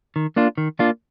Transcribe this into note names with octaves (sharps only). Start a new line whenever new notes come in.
D#3
A#3 D4 F4
D#3
A#3 D4 F4